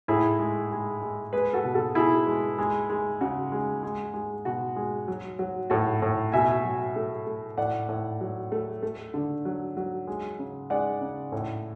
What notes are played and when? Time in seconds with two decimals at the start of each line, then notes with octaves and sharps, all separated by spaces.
0.08 A2 E4 G#4
0.39 G#3
0.71 G#3
1.01 G#3
1.33 G#3 G#4 B4
1.53 F#4 A4
1.64 B2
1.74 F#4 A4
1.95 B2 E4 G#4
2.27 G#3
2.58 G#3
2.90 G#3
3.21 C#3 F#4
3.52 G#3
3.83 G#3
4.14 G#3
4.45 B2 F#4
4.76 G#3
5.08 F#3
5.39 F#3
5.70 A2 F#4 A4
6.02 A2
6.32 B2 E5 G#5
6.64 F#3
6.96 A3
7.27 A3
7.58 A2 D5 F#5
7.89 A2
8.21 F#3
8.52 A3
8.83 A3
9.14 D3
9.45 F#3
9.77 F#3
10.07 G#3
10.39 C#3
10.70 G#3 D5 F#5
11.01 C#3
11.32 A2